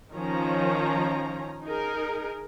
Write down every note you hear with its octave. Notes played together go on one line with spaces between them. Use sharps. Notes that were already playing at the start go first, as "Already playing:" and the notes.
D#3 F3 C#4 A#5
D#4 G#4 A#4